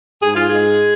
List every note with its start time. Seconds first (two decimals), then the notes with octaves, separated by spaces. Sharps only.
0.22 G#2 G#4
0.35 F4
0.49 G#3 G#4